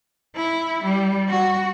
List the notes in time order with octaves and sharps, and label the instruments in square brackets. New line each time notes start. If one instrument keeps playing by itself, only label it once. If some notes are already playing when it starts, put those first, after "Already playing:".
[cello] E4
G3
F#4